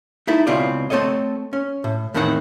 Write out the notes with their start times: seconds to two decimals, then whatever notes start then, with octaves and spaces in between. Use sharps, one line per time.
0.27 D#4 E4 A4
0.47 C#2 B2 C4 E4 F4 D5
0.90 A3 C4 A4 C#5 D#5
1.53 C#4
1.84 A2
2.14 E2 A2 D#3 C4 G4 F#5